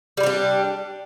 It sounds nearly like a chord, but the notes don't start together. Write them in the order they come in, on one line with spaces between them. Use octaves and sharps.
G3 E4 G4 D4